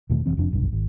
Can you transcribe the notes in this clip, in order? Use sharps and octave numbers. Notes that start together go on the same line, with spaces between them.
E2 B2 D#3 A3
F1 D2 E3 C4
F1 F2 D4
F1 B1 G2
G#1